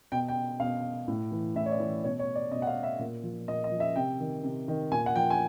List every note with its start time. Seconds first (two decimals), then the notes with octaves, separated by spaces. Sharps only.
0.12 B2 G5
0.28 G5
0.60 B2 F5
1.08 A2
1.31 E3
1.55 A2 E5
1.66 C#5
1.71 D5
1.79 E3
2.04 B2 C#5
2.19 C#5
2.35 D5
2.51 B2 D#5
2.62 F#5
2.67 F5
2.83 E5
2.99 A#2
3.23 F3
3.48 A#2 D#5
3.64 D#5
3.71 F3
3.80 E5
3.96 C3 G5
4.20 D#3
4.43 C3
4.68 D#3
4.92 A#2 G#5
5.06 F#5
5.16 F3 G5
5.30 G#5